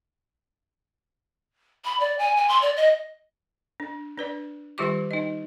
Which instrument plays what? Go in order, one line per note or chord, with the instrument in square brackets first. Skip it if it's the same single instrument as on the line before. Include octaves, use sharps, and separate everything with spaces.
[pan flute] B5
D5
G#5
G#5
C6
D5
D#5
[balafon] D4
D4 B4 D5
D#3 G3 F4 G4 C#6 D6
D#4 D#5